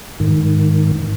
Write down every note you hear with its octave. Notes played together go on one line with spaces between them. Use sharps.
G#2 D#3